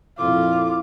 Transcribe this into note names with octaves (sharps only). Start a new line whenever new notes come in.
A#1 F2 C4 E4 F4 A4 D6